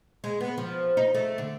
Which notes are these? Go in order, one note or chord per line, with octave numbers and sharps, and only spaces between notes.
G#3
B3
F3
D#4
A3
D3